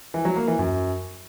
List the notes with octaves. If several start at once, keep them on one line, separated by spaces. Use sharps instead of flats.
E3
F#3
A#3
E3
F#2